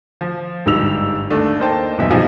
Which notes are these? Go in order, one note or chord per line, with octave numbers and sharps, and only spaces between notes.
F3
G1 G#2 G3 E6 F7
D#2 A3 D4
A#3 D#4 A#4 C5 G5 A5
D#1 F#2 B2 E3 D#4 E5
B2 F3 G3 D#4 F4 G#4